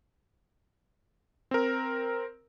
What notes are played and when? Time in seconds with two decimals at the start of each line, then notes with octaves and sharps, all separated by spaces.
1.51 C4 A#4